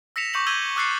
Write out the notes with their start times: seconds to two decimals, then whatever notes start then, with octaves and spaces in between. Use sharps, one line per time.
0.16 E6 A#6 B6 C#7 E7 F7
0.34 C#6 D6 G6 A#6 C#7 F#7
0.47 E6 G6 G#6 D#7 F#7 G7
0.76 D6 E6 F#6 A6 C7 C#7